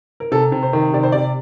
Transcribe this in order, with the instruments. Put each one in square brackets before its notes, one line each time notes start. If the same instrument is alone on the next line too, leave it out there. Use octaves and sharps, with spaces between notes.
[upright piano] A#4
C3 A4
C3
C5
D#3
C3 D5
C5
C3 D5